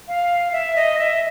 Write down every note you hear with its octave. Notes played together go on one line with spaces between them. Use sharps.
F5
E5
D#5
E5